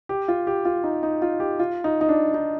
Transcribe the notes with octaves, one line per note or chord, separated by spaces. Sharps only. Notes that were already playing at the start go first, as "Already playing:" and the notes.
G4
F4
G4
F4
D#4
D#4
F4
G4
F4
D#4
D#4
D4
D#4